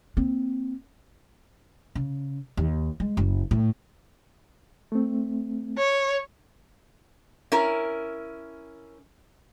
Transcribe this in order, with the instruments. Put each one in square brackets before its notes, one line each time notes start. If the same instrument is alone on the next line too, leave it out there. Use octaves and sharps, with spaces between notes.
[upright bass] A#3 C4
C#3
D#2
G#3
F#1
A2
[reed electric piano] A3 C4
[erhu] C#5
[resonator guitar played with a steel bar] C#4 E4 A#4